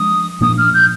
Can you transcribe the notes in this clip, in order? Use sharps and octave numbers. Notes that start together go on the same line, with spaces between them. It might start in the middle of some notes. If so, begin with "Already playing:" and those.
Already playing: F3 G#3 D4 D#6
A#2 F3 A#3 D4 D#6
F6
G6